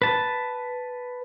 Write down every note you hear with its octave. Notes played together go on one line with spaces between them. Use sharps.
B4 A5